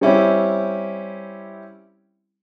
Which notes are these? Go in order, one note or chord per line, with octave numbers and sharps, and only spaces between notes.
G3 C4 C#4 E4 G4